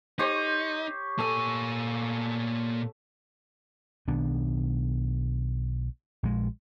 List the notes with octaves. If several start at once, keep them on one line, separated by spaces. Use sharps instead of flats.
D#4 G4 C5 C#5
A#2 A4 G#5 E6
B1 D#3 B3 D4
A#1 G#3